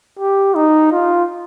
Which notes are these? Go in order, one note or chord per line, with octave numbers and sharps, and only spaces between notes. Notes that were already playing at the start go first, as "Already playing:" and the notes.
G4
D#4
F4